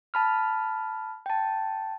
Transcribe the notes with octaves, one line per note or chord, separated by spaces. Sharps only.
A5 B5 F6
G5 A5